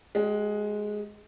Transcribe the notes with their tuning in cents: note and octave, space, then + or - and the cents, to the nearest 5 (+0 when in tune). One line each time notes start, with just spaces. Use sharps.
G#3 +10 G4 -35